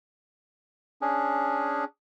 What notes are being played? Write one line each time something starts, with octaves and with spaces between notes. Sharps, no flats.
C#4 D4 G#4